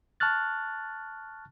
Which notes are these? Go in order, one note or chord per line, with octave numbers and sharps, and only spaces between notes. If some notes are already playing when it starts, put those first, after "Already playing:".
A5 C#6 F6 F#6 A6